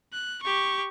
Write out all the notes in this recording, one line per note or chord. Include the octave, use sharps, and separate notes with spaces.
F#6
G4 C#6